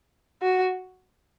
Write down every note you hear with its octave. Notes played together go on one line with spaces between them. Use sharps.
F#4